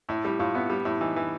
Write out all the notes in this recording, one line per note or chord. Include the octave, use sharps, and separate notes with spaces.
A2 E4
G3 E4
A2 F4
B3 E4
G3
A2 E4
E3 D#4
E3